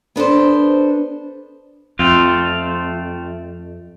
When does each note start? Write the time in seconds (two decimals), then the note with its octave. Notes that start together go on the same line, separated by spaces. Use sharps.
0.16 B3 D4 A4 C5
1.99 F2 A3 C4 F4